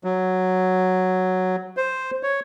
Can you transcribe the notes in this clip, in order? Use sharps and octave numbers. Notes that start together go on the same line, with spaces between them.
F#3
C5
C#5